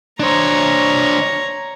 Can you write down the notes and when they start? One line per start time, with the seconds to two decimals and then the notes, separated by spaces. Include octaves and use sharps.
0.20 D4 C5 C#5 A#5